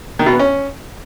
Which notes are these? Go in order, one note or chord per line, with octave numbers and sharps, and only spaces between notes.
D#3
B2
B3
C#4